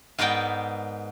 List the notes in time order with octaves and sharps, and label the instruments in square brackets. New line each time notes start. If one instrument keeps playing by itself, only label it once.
[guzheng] G#2 B3 A#4 D5 G5 B5